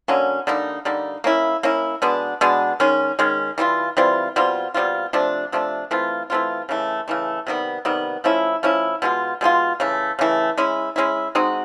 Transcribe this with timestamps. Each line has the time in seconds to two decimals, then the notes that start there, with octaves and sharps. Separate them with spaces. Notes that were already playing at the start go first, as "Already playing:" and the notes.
0.08 D3 F#3 A#3 C#4
0.47 D3 G3 A#3 D#4
0.85 D3 G3 A#3 D#4
1.24 A#3 C#4 E4
1.63 A#3 C#4 E4
2.02 B2 G#3 B3 D4
2.41 B2 G#3 B3 D4
2.80 D#3 G#3 C#4
3.19 D#3 G#3 C#4
3.58 E3 G3 C4 F4
3.97 E3 G3 C4 F4
4.36 B2 G3 C4 F4
4.74 B2 G3 C4 F4
5.13 C3 F3 A3 D4
5.52 C3 F3 A3 D4
5.91 E3 A3 C4 F4
6.30 E3 A3 C4 F4
6.69 C#3 E3 A3
7.08 C#3 E3 A3
7.47 C3 D#3 G3 B3
7.85 C3 D#3 G3 B3
8.24 F3 A3 C#4 E4
8.63 F3 A3 C#4 E4
9.02 B2 G#3 C4 F4
9.41 B2 G#3 C4 F4
9.80 C#3 E3 A3
10.19 C#3 E3 A3
10.58 G#3 C#4 E4
10.96 G#3 C#4 E4
11.35 G#3 C4 D#4 F#4